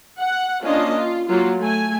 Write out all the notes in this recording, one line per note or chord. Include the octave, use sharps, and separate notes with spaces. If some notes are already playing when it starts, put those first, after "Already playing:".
F#5
A#3 C#4 D4 F4 D#5
F4
F#3 A#3 F4
A3 G#5